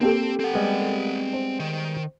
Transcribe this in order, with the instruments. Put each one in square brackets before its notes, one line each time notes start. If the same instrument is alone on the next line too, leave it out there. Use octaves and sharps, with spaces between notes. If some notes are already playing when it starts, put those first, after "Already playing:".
[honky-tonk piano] A#3 G4 A4 [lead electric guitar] C4
[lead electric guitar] C4 F#5
[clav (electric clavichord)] G3 G#3 B3
[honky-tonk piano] C5
[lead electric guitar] D#3